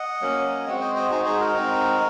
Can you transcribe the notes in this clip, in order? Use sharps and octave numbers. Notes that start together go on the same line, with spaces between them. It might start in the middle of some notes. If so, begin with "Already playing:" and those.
Already playing: D#5 F#5
F#3 A#3 C#4
G#3 C4 F#4
C5 D#5
C5 D#5
G#3 D#4 F#4 G#4 C5
G#4 C5
F#4 A#4
G#3 C4 D#4